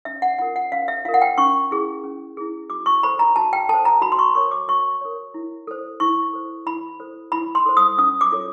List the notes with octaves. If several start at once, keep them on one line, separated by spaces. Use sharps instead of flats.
C#4 E5
F#5
F4 A#4 F#5
F#5
C#4 F5
E5
F4 A#4 F5
F#5
G5
C#4 C#6
E4 G#4
C#4
E4 G#4
F#4 D6
C#6
A4 C5 B5
A#5
F#4 A5
G5
A4 C5 A5
A#5
F#4 B5
C6
C#6
A#4 C#5 C#6
D6
F#4 C#6
A#4 C#5
E4
A4 C5
E4 C#6
A4 C5
E4 B5
A4 C5
E4 B5
C6
A4 C5
D#6
C#4 D#6
D6
F4 A4 C#5